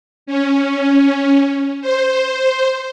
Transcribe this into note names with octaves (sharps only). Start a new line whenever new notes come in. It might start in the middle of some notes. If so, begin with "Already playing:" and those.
C#4
C5